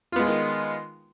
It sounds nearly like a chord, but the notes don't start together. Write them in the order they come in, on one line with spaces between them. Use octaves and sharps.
F4 B3 G#3 D#4 D#3